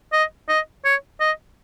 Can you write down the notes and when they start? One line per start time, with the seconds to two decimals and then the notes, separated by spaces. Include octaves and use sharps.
0.13 D#5
0.49 D#5
0.84 C#5
1.20 D#5